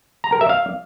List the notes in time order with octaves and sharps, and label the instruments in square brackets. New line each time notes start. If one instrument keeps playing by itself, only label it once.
[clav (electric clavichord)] A#5
A#4
E5
F5